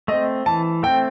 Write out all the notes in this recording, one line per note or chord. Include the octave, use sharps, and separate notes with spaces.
A3 C4 D#5
E3 A5
A3 C4 G5